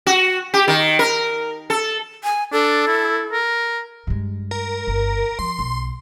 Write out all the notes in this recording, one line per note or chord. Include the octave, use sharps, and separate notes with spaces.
F#4
G4
D#3
A#4
A4
G#5
D4 A4
E4
A#4
G2 G#3
A#4
G1
F3 C6
B1